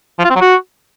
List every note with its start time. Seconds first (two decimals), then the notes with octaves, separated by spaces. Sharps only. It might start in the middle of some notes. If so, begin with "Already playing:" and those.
0.19 F3
0.24 F4
0.30 C4
0.36 F#3
0.41 F#4